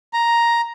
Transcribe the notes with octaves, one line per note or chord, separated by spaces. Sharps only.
A#5